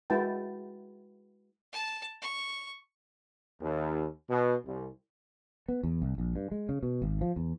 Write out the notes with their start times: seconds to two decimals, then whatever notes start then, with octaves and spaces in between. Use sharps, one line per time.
0.10 G#3 E4 F#4 B4 G5 A5
1.73 A5
2.22 C#6
3.60 D#2
4.28 B2
4.63 C2
5.68 B3
5.83 E2
6.02 C2
6.18 A#1
6.36 G2
6.51 G#3
6.69 C#3
6.83 B2
7.02 G#1
7.21 F3
7.36 E2